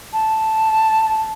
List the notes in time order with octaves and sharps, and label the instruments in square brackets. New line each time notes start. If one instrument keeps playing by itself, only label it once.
[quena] A5